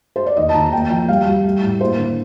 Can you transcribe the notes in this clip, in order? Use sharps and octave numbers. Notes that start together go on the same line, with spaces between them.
C5
D5
D#2 D#5
A5
D#2 A#5
A5
A#3 G5
F3 G5
G3 F5
G3
A3
A2
A#3 C5
D3